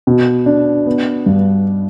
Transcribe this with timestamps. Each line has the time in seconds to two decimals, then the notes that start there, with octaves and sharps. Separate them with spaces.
0.07 B2
0.46 D4
0.86 B3
1.26 G2